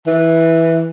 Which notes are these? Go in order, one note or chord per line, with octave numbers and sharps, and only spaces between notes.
E3